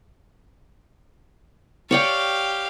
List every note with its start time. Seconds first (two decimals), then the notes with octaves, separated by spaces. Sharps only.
1.91 G4 C#5 D5 F5 G5